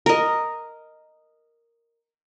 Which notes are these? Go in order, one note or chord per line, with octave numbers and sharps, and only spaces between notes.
A#4 D#5